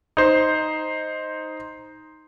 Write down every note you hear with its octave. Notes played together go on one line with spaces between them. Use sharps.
D#4 C5